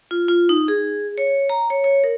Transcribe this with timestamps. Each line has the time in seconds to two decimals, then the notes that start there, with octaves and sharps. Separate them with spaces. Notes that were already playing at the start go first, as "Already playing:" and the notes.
0.11 F4
0.28 F4
0.49 D#4
0.68 G#4
1.18 C#5
1.50 A#5
1.70 C#5
1.84 C#5
2.04 A#4